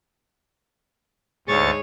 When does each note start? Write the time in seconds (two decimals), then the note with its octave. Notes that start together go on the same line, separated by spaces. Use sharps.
1.48 D2 G#2 G#4 C#5 C#6 A6